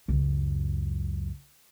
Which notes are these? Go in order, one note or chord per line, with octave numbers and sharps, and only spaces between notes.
C#2 F#2